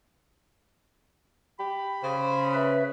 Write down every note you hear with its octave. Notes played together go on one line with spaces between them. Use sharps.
G4 B5
C#3 C5
B4 E5